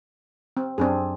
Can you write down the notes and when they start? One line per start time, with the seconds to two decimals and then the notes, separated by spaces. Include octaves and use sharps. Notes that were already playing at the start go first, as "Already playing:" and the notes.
0.57 C4
0.78 F#2 C4 D4 G#4